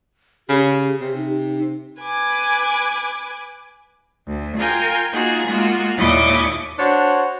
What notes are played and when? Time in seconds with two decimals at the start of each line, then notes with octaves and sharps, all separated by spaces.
0.49 C#3 G4
1.01 C3
1.16 D#4
2.01 B4 G#5 D6
4.27 D2
4.58 F4 A#4 G5 G#5 A#5
5.12 A#3 D#4 F4 F#4 G#4
5.48 G#3 A#3 F4 F#4
5.98 D#2 A#2 E4 D#5 C#6 D6
6.78 D4 F#4 C5 C#5